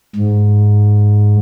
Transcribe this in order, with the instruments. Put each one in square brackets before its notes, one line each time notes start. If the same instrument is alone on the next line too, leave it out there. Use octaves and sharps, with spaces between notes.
[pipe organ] G#2